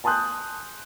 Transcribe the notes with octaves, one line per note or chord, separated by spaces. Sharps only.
G#5 A5 C6 D#6 F#6 G6